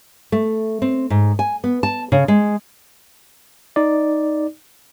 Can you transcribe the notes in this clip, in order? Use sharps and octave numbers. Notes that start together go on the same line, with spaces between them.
A3
C4
G#2
G#5
B3
A5
C#3
G#3
D#4 D5